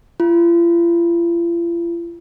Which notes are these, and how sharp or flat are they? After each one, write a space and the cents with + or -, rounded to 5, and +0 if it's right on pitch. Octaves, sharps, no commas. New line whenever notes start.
F4 -45